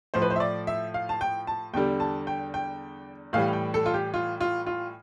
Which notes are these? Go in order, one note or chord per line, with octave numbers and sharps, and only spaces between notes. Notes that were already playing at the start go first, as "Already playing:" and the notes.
A2 F3 C5
B4
C5
E5
D5
E5
F5
A5
G5
A5
E2 D3 G3 G5
A5
G5
G5
A2 E3 G3 F5
G5
A4
F4
G4
F4
F4
F4